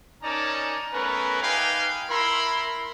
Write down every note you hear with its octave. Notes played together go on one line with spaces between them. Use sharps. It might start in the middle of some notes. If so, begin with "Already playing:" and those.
C#4 D#4 A#4 D5 A5 A#5
A3 B3 C#4 A#4 B4
D#4 G4 B4 F5 G5 G#5
E4 A#4 E5 B5 C6